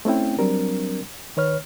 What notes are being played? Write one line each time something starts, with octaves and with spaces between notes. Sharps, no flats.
A3 C4 C#4 E4 G5
F#3 G3 C4 D4 A#4
D#3 B4 C#5 F6